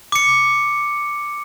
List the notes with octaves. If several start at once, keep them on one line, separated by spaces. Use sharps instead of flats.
D6 C#7